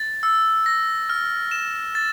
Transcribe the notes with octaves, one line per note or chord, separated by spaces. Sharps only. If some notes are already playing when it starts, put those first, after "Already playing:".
Already playing: A6
E6
A#6
F6
E7
A6